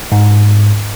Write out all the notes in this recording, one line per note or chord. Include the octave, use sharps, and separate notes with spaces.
G#2